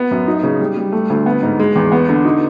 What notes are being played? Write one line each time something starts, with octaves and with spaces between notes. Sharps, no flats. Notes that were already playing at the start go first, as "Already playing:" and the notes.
Already playing: B3
F#2
D#4
C#3
G3
G3
A3
D2
B3
G#2
G#3
E2
B3
D3
D#4